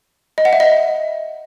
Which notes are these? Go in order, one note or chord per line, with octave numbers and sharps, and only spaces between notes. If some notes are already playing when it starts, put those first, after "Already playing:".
D#5
F#5
E5
D#5